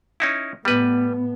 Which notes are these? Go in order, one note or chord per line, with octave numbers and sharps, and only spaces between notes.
C#4 D#4 E4
A2 G3 B3 B4